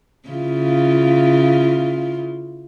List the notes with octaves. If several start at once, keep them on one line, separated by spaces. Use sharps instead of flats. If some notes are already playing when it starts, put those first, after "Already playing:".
C#3 E4 F4